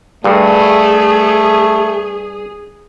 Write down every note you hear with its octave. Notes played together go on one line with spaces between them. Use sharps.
G2 A3 G#4